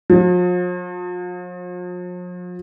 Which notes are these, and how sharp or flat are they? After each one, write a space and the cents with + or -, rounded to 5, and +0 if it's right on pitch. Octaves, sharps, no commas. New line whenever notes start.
F3 +45